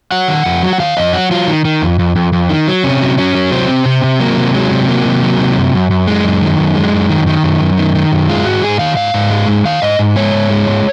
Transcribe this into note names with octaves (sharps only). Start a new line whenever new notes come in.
F#3 F#5
D#3
F2
F#3
F#5
D#3 F5
F2 D#5
F#3 F#4
F#3 F4
D#3
D#3
F2
F2
F2
F2
D#3
F#3
C3 C#4
F#3
F#3 C#4
F#3
C3 C4
C3
C3
C3
F#3 A#3
C3
F#3 G#3
C3
F#3 A#3
C3
F#3
C3
F#2
F#2
F#2
G#3
F#2
D#3
F#2
G#3
F#2
D#3
D#3
F#2
F#2
D#3
D#3
F#2
G#3 F4
G#2 F#4
G#2 G#4
D#3 F5
G#2 F5
G#2
G#3
G#2
D#3 F5
G#2 D#5
G#2
G#3 C#5
G#2
G#3
G#2